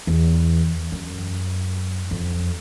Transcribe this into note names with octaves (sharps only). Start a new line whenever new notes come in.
E2
F#2
F2